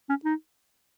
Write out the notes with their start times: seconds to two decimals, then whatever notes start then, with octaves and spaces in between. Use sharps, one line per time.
0.09 C#4
0.25 D#4